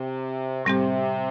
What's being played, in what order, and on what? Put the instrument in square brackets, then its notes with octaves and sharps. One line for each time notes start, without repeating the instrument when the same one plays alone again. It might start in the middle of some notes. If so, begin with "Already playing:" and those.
Already playing: [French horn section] C3
[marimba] A2 G3 C4 G4 [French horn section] C3